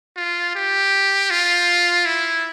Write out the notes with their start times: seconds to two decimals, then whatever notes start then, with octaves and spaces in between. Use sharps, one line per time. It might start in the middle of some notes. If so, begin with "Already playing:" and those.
0.16 F4
0.55 G4
1.30 F4
2.06 E4